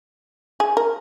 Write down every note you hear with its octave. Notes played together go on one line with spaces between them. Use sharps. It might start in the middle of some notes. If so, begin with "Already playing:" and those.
G#4
A#4